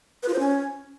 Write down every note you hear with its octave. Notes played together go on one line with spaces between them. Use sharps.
B4
F4
C5
C#4